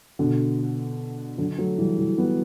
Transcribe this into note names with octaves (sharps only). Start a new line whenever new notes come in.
B2 D3
D3 F#3
F#3 A3
E3 G3
E3 G3
G3 B3